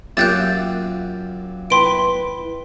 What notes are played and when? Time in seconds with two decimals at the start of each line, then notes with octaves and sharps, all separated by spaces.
0.17 F#2 A#3 F4 G4 E5 F#6 G6 A6
1.70 E4 B4 G5 C6 D7